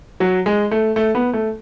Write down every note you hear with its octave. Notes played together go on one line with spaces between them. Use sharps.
F#3
G#3
A3
A3
B3
A3